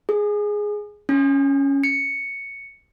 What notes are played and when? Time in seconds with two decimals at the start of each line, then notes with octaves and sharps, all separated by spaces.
0.09 G#4
1.09 C#4
1.84 C#7